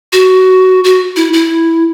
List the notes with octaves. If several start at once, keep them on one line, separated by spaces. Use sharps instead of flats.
F#4
F#4
E4
E4